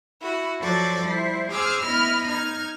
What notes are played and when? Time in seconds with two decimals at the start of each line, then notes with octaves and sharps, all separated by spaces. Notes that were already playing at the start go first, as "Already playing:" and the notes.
0.21 E4 F#4
0.59 F3 F#3 F#4 A4 C5 D5
1.03 G3 E4 C5
1.51 G#4 C5 D6 E6 F6
1.81 B3 E4 D#5 B5 F6
2.26 D#4 F6 G#6